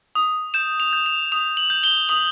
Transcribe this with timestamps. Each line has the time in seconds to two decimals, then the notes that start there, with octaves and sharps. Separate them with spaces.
0.15 D#6
0.54 G6 E7
0.80 F7
0.93 G6
1.06 F7
1.32 D#6 F7
1.57 F#7
1.70 G6
1.84 G7
2.09 D#6 F#7